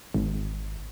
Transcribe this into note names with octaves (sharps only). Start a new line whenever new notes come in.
G#1